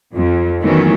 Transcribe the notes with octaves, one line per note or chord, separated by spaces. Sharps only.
F2
D#3 E3 F#3 A3 B3 C#4